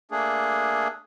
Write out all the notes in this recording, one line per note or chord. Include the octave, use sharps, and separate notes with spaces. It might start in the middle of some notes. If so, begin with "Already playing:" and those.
A3 A#3 D4 G#4